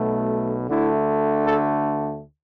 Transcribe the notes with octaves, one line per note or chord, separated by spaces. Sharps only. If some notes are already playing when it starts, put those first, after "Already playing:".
Already playing: B1 B2 A3
D2 D3 A3 E4
A4